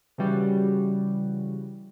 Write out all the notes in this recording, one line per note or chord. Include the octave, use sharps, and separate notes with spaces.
C#3 E3 G3 F#4